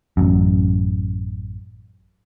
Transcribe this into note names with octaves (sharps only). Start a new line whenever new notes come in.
A1 F#2